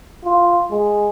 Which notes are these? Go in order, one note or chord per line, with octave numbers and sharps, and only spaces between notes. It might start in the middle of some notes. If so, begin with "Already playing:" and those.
F4
G#3